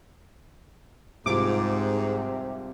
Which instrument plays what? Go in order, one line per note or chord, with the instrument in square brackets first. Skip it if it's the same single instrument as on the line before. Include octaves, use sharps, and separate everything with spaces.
[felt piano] C2 F4 [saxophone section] G#2 [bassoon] C3 [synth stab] D6